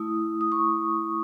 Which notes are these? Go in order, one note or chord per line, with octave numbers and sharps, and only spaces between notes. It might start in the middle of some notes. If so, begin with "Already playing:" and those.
Already playing: A3 E4 D#6
D#6
C#6